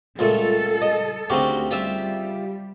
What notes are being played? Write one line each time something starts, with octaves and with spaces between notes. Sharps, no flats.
C#2 A#2 G3 A3 F4 A4
D#5
D2 C#3 C4 D#4 F#4 G4 A#4
G3 F4 G4 E5